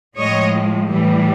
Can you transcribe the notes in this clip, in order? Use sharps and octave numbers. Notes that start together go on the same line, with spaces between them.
A2 F3 G#3 C#5 D#5
A2 E3 G3